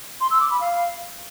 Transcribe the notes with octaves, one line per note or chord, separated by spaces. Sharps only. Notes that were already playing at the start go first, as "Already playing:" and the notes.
C6
E6
D6
B5
F5